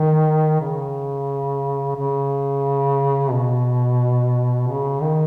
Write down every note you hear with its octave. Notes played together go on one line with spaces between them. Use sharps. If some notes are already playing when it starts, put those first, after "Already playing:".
Already playing: D#3
C#3
C#3
B2
C#3
D#3